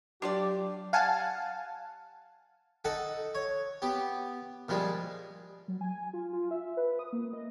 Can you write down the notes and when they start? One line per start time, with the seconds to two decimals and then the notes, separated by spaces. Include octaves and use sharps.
0.22 F#3 D4 F4 G4 D5
0.93 F5 F#5 G#5 A5
2.85 D#4 A4 F#5 A5
3.35 C#5
3.82 B3 G4
4.69 A#2 F3 G3 G#3
5.68 F#3
5.81 G#5
6.13 F4
6.33 F4
6.51 E5
6.77 B4
6.99 D#6
7.12 A#3
7.33 D#5